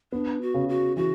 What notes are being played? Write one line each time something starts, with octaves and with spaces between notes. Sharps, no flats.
B3 D4
F#4
C#3
F#4
E3 F#4